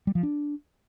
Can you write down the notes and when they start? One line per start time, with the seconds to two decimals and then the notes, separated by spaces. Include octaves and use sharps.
0.07 G3
0.15 F3
0.23 D4